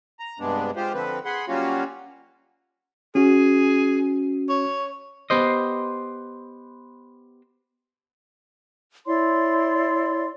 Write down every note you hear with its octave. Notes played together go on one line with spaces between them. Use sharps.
A#5
G2 C3 G#3 B3 D4
G#3 F4 G4 C5
D3 F3 C4 B4
G#4 F#5 B5 C6
F#3 G3 A#3 C#4 F4 F#4
C#4 F#4 G#4
C#5
B3 G4 C5 D#5
E4 C#5 D5 C6